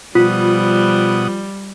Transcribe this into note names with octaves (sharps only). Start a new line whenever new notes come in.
B2 F3 G3 F4 F#5 D#6